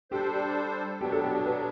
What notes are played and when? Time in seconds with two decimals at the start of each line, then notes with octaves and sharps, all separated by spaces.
0.11 G3 D4 G4 A4 C5
1.01 B2 F#3 B3 D4 G4
1.12 A4
1.23 G4
1.46 B4